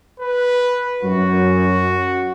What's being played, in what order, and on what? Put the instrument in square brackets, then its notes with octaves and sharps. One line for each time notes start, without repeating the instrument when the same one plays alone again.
[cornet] B4
[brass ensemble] F#2 [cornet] F#4